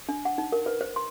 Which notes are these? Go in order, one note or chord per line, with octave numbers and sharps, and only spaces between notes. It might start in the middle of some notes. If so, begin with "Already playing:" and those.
D4
F#5
D#4
A#4
B4
C5
C6